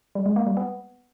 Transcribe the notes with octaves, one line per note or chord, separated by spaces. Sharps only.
G3
G#3
A#3
G3
B3